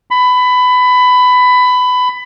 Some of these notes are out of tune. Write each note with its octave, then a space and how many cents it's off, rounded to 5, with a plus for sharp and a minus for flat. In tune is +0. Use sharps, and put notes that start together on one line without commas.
B5 +20